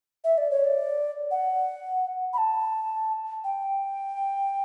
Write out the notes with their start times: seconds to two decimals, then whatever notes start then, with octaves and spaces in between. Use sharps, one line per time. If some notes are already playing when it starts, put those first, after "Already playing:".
0.24 E5
0.38 D5
0.51 C#5
0.64 D5
1.31 F#5
2.33 B5
2.38 A5
3.44 G5